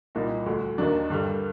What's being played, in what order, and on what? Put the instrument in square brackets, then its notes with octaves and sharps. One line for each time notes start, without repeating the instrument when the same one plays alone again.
[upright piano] C2 A#2 G3 D#4
D2 D3 G3
D#2 D#3 F#3 D4
G2 D3 G3